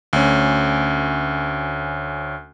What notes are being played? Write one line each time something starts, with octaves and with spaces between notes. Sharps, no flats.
D2 C#4